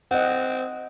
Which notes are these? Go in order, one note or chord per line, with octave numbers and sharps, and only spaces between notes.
C4 D#5 F#5